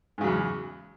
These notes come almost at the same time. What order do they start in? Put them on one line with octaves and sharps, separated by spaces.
G#2 C#3 F#3 E2